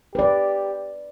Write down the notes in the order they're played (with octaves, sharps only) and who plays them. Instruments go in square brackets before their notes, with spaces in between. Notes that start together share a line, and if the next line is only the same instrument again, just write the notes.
[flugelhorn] G4 [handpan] B4 D5